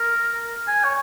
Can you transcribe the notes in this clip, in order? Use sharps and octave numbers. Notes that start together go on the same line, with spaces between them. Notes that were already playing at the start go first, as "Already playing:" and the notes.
Already playing: A#4
G#5
C#5